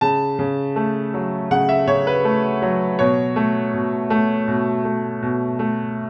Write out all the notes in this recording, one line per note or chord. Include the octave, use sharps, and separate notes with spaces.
C#3 A5
C#3
A3
F#3
C#3 F#5
E5
C#3 C#5
B4
A3
F#3
B2 C#5
A3
B2
A3
B2
A3
B2
A3